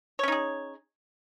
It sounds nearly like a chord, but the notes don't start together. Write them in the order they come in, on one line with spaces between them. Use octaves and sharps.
C#5 C#4 D#4 G#4